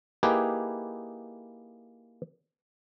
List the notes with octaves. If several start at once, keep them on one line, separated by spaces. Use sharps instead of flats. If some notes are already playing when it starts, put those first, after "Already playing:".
A#3 D#4 E4 G4 G#4 B4